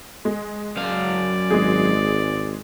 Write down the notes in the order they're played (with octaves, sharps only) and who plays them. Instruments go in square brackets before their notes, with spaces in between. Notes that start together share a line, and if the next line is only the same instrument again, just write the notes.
[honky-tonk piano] G#3
[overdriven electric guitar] F#2 F5 [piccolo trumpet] D5
[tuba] G#1 [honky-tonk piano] G#3 G#4